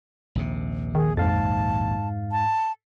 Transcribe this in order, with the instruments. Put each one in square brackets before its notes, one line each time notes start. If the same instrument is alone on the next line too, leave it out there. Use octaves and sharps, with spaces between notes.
[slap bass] A#1 D#2 C3
[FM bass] D#3 [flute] G#4
[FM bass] F2 [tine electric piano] G#2 F5 A6 [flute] A5
[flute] A5